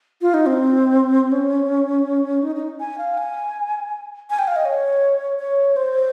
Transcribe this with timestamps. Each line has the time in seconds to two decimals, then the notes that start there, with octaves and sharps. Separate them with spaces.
0.22 F4
0.34 D#4
0.46 C4
1.32 C#4
2.43 D#4
2.56 D#4
2.80 G#5
2.98 F5
3.17 G#5
4.30 G#5
4.39 G5
4.48 F5
4.56 D#5
4.65 C#5
5.39 C#5
5.76 C5